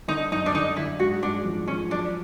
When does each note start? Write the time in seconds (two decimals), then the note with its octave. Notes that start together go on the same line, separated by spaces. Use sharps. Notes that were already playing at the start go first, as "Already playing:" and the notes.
0.08 D3 D#4
0.32 F#2 D#4
0.46 D4
0.55 D3 D#4
0.76 D3 E4
0.99 G#2 F#4
1.22 G#2 D4
1.45 F3
1.67 F3 C#4
1.91 F#3 D4